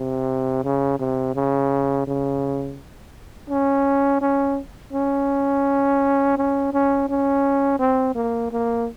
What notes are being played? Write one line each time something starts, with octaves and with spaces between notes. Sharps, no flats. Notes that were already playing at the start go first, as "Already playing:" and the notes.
Already playing: C3
C#3
C3
C#3
C#3
C#4
C#4
C#4
C#4
C#4
C#4
C4
A#3
A#3